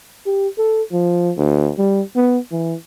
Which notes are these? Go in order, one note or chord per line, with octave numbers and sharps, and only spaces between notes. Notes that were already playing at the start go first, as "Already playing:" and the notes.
G4
A4
F3
D2
G3
B3
E3